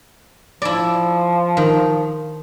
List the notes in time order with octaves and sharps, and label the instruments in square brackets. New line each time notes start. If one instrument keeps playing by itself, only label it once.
[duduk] F3 [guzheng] E4 D5
[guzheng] D#3